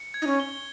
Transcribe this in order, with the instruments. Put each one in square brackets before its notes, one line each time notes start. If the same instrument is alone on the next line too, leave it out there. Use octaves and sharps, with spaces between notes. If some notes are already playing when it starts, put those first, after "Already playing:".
Already playing: [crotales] C#7
G#6
[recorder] D#4
C#4
[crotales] G7